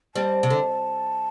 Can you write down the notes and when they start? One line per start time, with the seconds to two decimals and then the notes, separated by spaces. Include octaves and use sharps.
0.15 G3 C4 A5
0.43 C3
0.50 D3